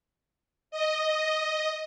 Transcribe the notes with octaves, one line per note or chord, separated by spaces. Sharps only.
D#5